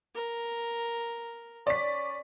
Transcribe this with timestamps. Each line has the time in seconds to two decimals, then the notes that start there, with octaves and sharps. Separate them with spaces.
0.15 A#4
1.67 C#4 D5 B6